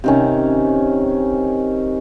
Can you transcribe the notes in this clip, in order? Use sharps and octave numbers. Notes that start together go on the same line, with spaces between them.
C3 D#3 C#4